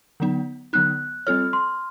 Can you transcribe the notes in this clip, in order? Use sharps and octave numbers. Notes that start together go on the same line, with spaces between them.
D3 F#3 B3 D#4
D3 F#3 B3 D#4 F#6
G3 C4 F4 A4 C#5 F6
C6